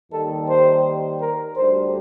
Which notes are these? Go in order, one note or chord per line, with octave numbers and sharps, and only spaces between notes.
D#2 D#3 G3 A4
C5
A#4
D2 D3 G3 C5